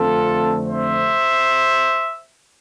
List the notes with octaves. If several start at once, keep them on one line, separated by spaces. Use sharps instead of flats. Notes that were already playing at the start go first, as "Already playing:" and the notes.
Already playing: F2 D3 A3 C4 F4 A4
C5 E5